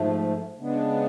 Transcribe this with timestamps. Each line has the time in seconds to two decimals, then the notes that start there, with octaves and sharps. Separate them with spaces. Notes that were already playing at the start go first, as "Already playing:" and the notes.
Already playing: G#2 F3 A3
0.59 C#3 G#3 B3 D4